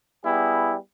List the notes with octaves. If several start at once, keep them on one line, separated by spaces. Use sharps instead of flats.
G3 B3 E4 G#4